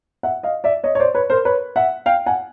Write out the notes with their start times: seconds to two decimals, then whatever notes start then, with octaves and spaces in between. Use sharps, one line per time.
0.23 E5 F#5
0.43 D#5 F5
0.64 D5 E5
0.84 C#5 D#5
0.95 C#5
1.00 C5 D5
1.15 B4 C#5
1.30 A#4 C5
1.45 B4 C#5
1.76 E5 F#5
2.06 F5 G5
2.26 F#5 G#5